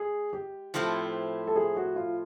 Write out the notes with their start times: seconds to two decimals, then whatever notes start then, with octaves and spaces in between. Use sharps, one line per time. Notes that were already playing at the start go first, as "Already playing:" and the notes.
Already playing: G#3 G#4
0.33 G4
0.74 A2 F3 A3 C4 E4
1.47 A4
1.56 G#4
1.77 F#4
1.96 F4